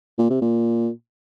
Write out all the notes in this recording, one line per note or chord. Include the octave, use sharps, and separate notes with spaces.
A#2
C3
A#2